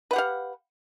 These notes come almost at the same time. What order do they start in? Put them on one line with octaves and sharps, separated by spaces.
B4 F#5 G4 F5